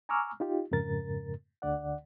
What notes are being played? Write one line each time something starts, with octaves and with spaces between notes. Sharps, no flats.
G#5 A#5 C#6 D6 E6 F6
D#4 F4 G4
F2 G#2 C#3 A#4 A6
D2 D3 D5 F#5